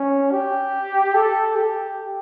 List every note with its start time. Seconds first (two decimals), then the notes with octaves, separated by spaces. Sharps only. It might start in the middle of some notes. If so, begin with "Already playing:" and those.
Already playing: C#4
0.32 G4
1.14 A4
1.56 G4